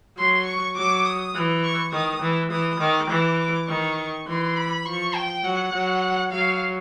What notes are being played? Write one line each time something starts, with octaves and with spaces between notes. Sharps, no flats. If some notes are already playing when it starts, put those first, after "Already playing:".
F#3 C6
C#6
F#3 D6
D#6
E3
C#6
D#3 D#6
E3
E3 D#6
D#3 D6
E3
D6
D#3 C#6
E3 C6
B5
F3 C#6
G5
F#3 F#5
F#3
F#3 F5